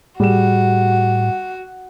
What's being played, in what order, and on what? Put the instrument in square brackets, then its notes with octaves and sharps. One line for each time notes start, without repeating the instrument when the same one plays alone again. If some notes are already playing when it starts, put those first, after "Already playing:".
[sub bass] A2 [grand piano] G3 G#4 E7 [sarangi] F#4